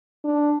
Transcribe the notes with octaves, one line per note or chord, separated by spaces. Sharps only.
D4